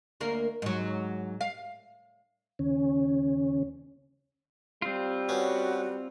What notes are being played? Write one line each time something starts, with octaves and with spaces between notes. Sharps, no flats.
D2 A#3 A#4
G#2 F#3
F5
D#2 C#3 C#4
G3 C4 F4
B3 C#4 F#4